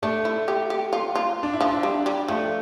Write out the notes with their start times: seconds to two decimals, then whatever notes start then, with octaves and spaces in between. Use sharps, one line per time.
0.03 A3 D4
0.25 E4
0.48 G4
0.70 G4
0.93 F4
1.15 F4
1.43 D4
1.53 E4
1.61 F3
1.68 D4
1.83 G3
2.06 G3
2.28 F3 A3